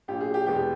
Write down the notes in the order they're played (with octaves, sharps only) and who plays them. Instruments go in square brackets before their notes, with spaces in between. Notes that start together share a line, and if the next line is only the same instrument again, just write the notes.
[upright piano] A#1 A#2 F#3 G4
G#4
G4
E2 B2 G#3 G4